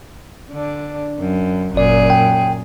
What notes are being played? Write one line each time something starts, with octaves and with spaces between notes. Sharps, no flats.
D3 D4
F#2
G1 F#2 A#2 G#4 D5
G5